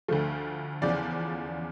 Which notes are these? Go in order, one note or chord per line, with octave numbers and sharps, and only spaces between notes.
D2 D3 F3 A3
E2 C#3 F3 D5